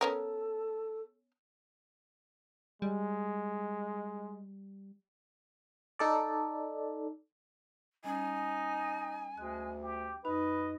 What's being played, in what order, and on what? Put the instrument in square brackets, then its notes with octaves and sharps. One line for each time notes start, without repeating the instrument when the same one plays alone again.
[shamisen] B3 C#4 A#4 [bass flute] A4
[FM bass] G3 [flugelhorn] G#3
[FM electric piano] D#4 A4 D5
[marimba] G3 C#4 [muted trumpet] D#4 [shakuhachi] G#5
[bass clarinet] D2 [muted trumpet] G#3 [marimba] F#6
[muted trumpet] G4
[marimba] F#2 D#4 [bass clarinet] B4 [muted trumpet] D#5